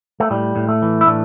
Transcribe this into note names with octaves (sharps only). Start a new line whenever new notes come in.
A3
A2 G3
A2
A3
E3
E4
A2 A3 D4